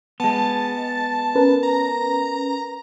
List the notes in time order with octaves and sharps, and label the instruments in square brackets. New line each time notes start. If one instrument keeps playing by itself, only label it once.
[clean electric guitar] G#3 B3 [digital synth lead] A5
[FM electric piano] C#4 A#4 B4
[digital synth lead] A#5